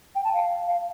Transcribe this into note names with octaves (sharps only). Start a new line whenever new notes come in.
G5
A5
F5